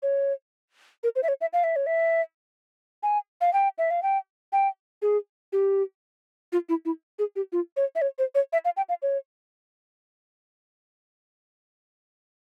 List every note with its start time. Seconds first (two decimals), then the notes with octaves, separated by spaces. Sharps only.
0.03 C#5
1.04 A#4
1.16 C5
1.23 E5
1.28 C#5
1.41 E5
1.53 F5
1.64 E5
1.76 C#5
1.87 E5
3.03 G#5
3.41 F5
3.53 G5
3.78 E5
3.91 F5
4.03 G5
4.53 G5
5.02 G#4
5.53 G4
6.52 F4
6.69 E4
6.85 E4
7.19 G#4
7.36 G4
7.52 F4
7.77 C#5
7.95 E5
8.02 C#5
8.19 C5
8.35 C#5
8.53 E5
8.65 F5
8.77 G5
8.89 F5
9.02 C#5